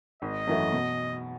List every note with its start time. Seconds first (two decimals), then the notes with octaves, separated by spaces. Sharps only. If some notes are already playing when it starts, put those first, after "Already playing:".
0.22 G#1 D#5
0.47 F#2 E3 A3
0.72 B2